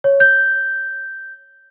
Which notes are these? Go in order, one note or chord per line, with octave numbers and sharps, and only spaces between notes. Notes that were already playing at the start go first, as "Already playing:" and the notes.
C#5
G6